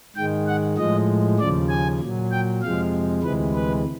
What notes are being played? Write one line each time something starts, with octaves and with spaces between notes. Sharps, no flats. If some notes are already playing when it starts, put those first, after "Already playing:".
G#2 D#3 G#3 G5
F#5
A2 F3 G#3 D#5
D#2 C#3 F3 D5
G#5
A#2 F#3
G5
F2 C3 F3 G#3 F5
D2 C3 E3 G#3 B4
B4